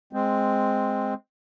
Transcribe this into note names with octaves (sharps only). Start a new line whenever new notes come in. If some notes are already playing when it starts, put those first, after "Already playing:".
G#3 C4